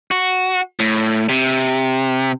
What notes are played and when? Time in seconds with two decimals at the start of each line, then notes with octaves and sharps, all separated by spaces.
0.11 F#4
0.80 A2
1.29 C3